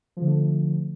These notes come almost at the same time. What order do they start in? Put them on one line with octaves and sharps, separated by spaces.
F3 D3 A3